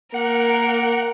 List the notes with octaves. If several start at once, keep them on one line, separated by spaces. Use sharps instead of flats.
A#3 A#4 F#5